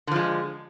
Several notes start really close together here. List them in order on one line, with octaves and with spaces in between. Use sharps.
D3 F3 G#3